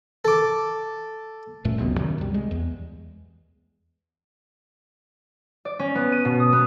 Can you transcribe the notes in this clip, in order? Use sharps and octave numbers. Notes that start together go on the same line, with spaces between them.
A4 D6
F1 F#2 A#2 A3
F1 C#2 F#3 B3
F#2 C3 D#3 F#3
C2 G3
G#3
E2
D5
C#4
B3
D#7
B2
D#6
B3